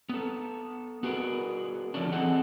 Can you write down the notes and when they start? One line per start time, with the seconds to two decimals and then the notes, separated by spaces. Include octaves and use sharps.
0.09 B3 A4
1.03 B3 F#4 G#4 A#4 B4
1.94 D3 F3 F#3 A3 C#4 D4
2.12 E3 C4 G#4 A4 D#5 F#5